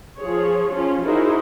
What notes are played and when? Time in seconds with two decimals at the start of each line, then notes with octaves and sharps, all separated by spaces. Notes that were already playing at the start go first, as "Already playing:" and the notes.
0.18 F3 G#4 C#5
0.71 F3 C#4 F4
1.04 D#4 E4 F#4 G#4 A#4 C5